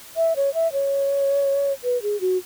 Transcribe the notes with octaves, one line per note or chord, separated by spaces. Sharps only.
E5
C#5
E5
C#5
B4
G#4
F#4